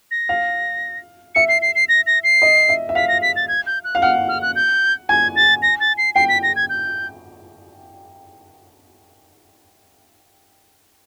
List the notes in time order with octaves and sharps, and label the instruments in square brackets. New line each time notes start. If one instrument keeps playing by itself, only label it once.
[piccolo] A#6
[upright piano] F5
[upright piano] E5 [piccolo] C#7
[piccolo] C7
C7
C7
A#6
A#6
C7
[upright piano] D#5
E5
E5
[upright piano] F5 [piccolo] B6
[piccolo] A#6
B6
A6
G#6
G6
F#6
[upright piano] F5
[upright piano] F#5 [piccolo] F6
[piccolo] F6
F#6
G6
[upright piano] G#5 [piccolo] G#6
[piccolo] A6
A#6
A6
C7
[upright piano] G5 [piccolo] C7
[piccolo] B6
A#6
G#6
G6